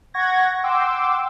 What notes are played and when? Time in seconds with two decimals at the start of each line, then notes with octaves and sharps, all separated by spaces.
0.14 F#5 C#6 G#6 A#6
0.64 F#5 G5 C6 D6 E6